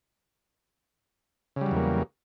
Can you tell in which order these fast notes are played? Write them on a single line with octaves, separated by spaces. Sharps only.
C#3 G3 F#3 E2 A#3